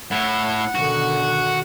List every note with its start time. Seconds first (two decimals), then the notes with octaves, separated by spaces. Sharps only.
0.11 A2 E4 F#5
0.75 B2 D3 D#3 F#4